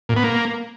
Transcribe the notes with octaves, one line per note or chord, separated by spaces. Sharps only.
A#2
B3
A#3